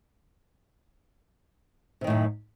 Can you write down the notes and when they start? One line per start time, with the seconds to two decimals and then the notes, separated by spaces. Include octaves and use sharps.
2.01 C3
2.04 D#3
2.07 A2
2.10 F#2